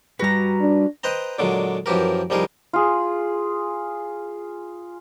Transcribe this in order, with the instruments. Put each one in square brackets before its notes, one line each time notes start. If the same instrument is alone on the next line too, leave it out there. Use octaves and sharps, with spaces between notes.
[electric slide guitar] G3 B4 [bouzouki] F#4 A#5
[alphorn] D4
[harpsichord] B4 C5 D#5 G5 A#5
A#2 D3 F#3 G#3
F#2 E3 F3 G4 A#4
C2 F3 G3 D#4 G#4 A#4
[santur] F4 G#4